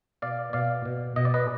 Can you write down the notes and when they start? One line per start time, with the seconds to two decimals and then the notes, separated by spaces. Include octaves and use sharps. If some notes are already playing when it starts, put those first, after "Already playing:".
0.22 B2 D5 F5
0.53 B2 D5 F5
0.85 B2
1.16 B2 D#5
1.25 D5
1.34 B4 D#5